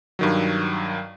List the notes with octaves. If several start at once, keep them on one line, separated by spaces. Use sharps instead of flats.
G2 D#3 F#3